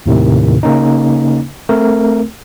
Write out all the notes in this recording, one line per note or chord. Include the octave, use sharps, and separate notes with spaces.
D#2 A2 C3 D#3
C#3 A#3 C#4 D#4
A3 C4 A#4